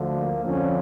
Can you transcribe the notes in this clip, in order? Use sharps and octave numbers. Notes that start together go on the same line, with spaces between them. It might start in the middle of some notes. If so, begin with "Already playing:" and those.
Already playing: D2 D3 F3
A#3
F2 D3 F3 C#4